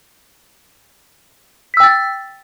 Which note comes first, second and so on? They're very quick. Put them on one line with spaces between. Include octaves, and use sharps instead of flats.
B6 E6 G5 A6